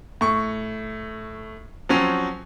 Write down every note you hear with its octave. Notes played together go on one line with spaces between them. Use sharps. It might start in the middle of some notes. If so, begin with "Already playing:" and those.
A2 C#6
F3 F#3 C4 C#4